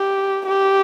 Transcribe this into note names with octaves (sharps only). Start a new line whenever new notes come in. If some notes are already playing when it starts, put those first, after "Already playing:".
Already playing: G4
G4